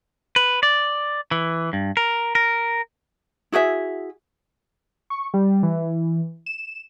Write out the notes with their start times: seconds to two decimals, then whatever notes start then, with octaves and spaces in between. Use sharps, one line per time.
0.36 B4
0.63 D5
1.31 E3
1.73 G2
1.97 A#4
2.35 A#4
3.52 E4 F#4 G#4 E5
5.10 C#6
5.34 G3
5.63 E3
6.46 E7